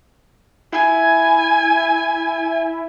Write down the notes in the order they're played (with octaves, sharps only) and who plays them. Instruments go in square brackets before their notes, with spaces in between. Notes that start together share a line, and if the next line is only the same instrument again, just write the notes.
[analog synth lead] E4 [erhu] G#5